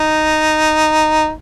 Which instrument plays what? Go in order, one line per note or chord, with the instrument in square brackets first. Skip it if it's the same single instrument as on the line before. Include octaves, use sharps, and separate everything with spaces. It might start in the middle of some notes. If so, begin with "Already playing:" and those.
Already playing: [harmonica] D#4